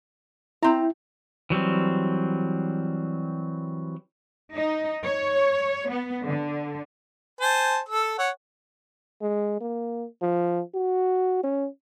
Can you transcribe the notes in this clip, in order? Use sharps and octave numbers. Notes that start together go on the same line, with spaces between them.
C4 E4 A#5
E3 F#3 G3 C4
D#4
C#5
B3
D3
C5 G#5 A5
A4 E6
C#5 F#5
G#3
A#3
F3
F#4
C#4